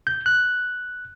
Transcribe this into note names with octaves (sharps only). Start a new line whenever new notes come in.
G6
F#6